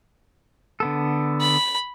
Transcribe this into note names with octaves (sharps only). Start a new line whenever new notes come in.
D3 B3 A4
B5